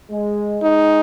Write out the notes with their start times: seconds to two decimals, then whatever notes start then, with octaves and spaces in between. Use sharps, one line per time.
0.11 G#3
0.62 G#3 D#4